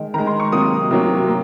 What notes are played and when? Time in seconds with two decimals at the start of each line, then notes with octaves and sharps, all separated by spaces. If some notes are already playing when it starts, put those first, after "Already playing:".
Already playing: D#3 G#3
0.14 D#3 G#3 A#5
0.27 C6
0.40 C#6
0.52 C3 F#3 A#3 D#6
0.91 C3 F#3 A#3
1.28 A#3